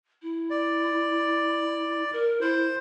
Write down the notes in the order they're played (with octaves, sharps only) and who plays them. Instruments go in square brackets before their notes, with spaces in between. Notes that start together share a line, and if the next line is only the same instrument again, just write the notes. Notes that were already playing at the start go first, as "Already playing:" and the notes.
[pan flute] E4
[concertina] D5
[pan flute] A#4
[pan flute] E4 [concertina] C5